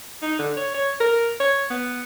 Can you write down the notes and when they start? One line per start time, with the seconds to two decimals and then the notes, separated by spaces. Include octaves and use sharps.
0.22 D#4
0.39 D3
0.57 C#5
0.74 C#5
1.00 A#4
1.40 C#5
1.70 B3